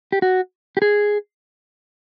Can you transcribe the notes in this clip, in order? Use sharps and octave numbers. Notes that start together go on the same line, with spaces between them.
G4
F#4
G4
G#4